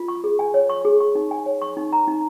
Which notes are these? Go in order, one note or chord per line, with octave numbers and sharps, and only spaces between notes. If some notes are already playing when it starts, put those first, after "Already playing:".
Already playing: F4
C#6
G#4
G#5
C#5
C#6
G#4
C#6
D#4
G#5
C#5
C#6
D#4
A#5
D#4